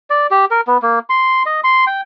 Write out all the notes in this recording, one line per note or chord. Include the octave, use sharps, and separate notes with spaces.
D5
G4
A#4
B3
A#3
C6
D#5
C6
G5